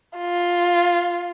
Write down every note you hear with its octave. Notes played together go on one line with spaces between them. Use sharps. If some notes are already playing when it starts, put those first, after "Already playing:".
F4